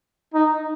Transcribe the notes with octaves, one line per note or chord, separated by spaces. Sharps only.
D#4